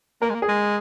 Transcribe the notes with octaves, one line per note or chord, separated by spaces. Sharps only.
A#3 A#4
G#3
A#3
G#4
G#3